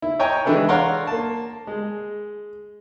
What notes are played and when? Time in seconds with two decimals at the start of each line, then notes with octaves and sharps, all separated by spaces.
0.02 E4
0.19 C#5 D#5 G5 G#5 A#5 C#6
0.45 E3 G#3 D4 E4 A4 B4
0.69 C#5 D5 F5 F#5 A#5 C6
1.07 A#3 A5
1.67 G#3